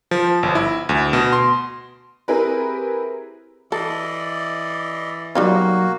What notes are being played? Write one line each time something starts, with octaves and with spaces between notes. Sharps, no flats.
F3
G1
E4
D2
B2
C6
C4 E4 G4 G#4 A#4 B4
E3 A4 D5 D#5
B2 F#3 G3 A#3 D#4 F4 F#4